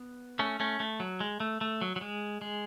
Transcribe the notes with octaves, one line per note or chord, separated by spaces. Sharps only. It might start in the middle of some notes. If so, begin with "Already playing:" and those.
Already playing: B3
A3 C#4
A3 C#4
A3
F#3
G#3
A3
A3
F#3
F#3
G#3
G#3